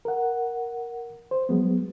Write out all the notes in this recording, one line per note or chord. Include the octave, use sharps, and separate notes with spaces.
A#4 F#5
C5
F#3 G#3 B3